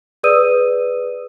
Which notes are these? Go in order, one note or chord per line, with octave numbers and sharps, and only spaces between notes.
G#4 B4 D5 D#6 E6 D#7